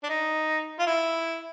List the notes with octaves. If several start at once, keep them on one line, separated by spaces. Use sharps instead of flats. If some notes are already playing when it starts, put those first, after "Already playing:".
D4
D#4
F4
E4